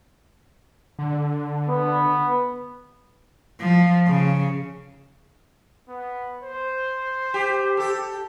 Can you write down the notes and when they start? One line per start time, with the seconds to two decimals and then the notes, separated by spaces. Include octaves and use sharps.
0.99 D3
1.69 B3
3.60 F3
4.07 C#3
5.89 B3
6.44 C5
7.34 G4
7.77 G4 A4